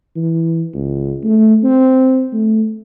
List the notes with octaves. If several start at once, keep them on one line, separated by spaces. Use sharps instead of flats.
E3
C#2
A3
C4
A3